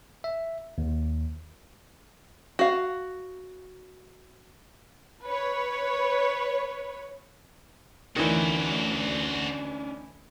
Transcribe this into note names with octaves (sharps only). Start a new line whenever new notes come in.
E5
D#2
F#4 F5
B4 C#5
D2 D#3 E3 C#4 D4 F#4 C5